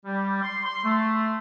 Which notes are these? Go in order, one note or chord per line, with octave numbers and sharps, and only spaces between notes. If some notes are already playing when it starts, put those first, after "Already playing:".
G3
C6
C6
A3